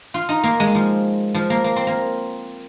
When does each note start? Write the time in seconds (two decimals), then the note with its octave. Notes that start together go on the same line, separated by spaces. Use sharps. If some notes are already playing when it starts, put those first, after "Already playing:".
0.14 F4
0.29 D#4
0.43 A#3
0.60 G#3
0.75 F3
1.34 F3
1.50 A#3
1.64 A#3
1.76 C4
1.87 A#3